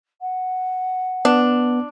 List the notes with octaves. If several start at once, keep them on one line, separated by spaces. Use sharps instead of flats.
F#5
B3 D4